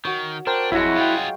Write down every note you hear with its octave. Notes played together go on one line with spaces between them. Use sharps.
D#3 F#4 C#5
D4 A#4 C5 G5
G#1 F2 F#3 G#3 E4 F#4
F4 G#4 F5 G5